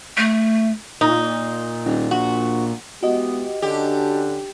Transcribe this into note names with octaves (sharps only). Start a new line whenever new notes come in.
A3
A#2 D#4
D#1
A#1 F#4
E3 G#3 B3 F#4 G4 D#5
D3 C#4 D4 G4